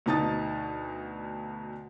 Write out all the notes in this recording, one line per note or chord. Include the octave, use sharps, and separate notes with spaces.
D2 B2 D#4 A5 D#6 A6